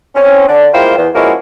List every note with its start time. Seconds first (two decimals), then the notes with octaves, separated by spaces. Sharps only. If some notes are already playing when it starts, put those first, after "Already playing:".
0.15 C4 C#4
0.48 D3 D4
0.73 G#3 A#3 E4 F4 C5 G5
0.97 E2
1.15 F3 G#3 A#3 C#4 E4 F#4